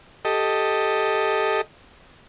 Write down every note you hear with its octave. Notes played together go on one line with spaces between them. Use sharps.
G4 A4 D#5